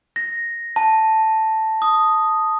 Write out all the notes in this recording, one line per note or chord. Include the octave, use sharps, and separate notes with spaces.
A#6
A5
D#6